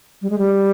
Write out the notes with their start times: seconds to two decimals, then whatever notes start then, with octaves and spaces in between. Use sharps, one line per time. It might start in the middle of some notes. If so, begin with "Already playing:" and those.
0.22 G3
0.30 G#3
0.38 G3